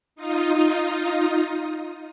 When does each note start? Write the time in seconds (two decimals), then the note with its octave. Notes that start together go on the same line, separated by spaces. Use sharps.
0.16 D#4 F4 D#6